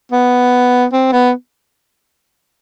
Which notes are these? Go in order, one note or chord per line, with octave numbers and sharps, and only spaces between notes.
B3
C4
B3